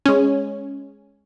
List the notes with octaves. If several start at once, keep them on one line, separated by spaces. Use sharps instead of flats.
G#3 C#4